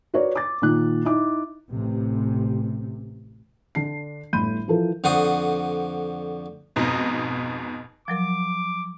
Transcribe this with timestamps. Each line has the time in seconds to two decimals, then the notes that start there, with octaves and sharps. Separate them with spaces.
0.14 F#4 A#4 B4 C#5 D5
0.36 D6 A6
0.62 A#2 D#3 F#6
1.05 D#4 E4 D6
1.71 A1 C3
3.75 D3 D4 C7
4.33 G1 A2 B5 C6 G6 D#7
4.68 E3 F3 A4 A#4
5.04 F2 D3 F#4 C5 D#6
6.76 F2 G#2 B2 D#4
8.08 F3 F#3 A#4 D6